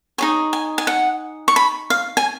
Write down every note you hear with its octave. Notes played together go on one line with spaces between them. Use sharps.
D#4 G#4 C#5 G#5
G#5
G#5
F#5
C#6
B5
F5
G#5